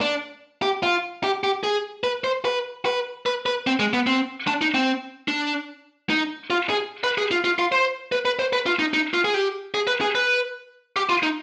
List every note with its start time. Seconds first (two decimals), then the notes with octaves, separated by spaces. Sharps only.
0.01 D4
0.62 G4
0.83 F4
1.24 G4
1.44 G4
1.63 G#4
2.04 B4
2.24 C5
2.45 B4
2.86 B4
3.26 B4
3.46 B4
3.67 C4
3.79 G#3
3.93 B3
4.07 C4
4.47 D4
4.61 D#4
4.74 C4
5.28 D4
6.10 D#4
6.50 F4
6.70 G#4
7.04 B4
7.18 G#4
7.31 F4
7.44 F4
7.59 F4
7.72 C5
8.12 B4
8.25 B4
8.39 C5
8.53 B4
8.66 F4
8.79 D#4
8.94 D#4
9.14 F4
9.24 G#4
9.34 G4
9.74 G#4
9.87 B4
10.01 G#4
10.15 B4
10.96 G4
11.09 F4
11.23 D#4